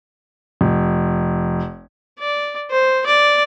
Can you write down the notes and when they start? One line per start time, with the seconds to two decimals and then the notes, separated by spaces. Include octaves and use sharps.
0.61 F1
2.19 D5
2.70 C5
3.06 D5